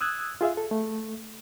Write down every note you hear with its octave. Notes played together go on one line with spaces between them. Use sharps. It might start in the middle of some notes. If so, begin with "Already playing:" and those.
D#6 E6 F#6 G#6
F4 G#4 E5 F5
A4
A3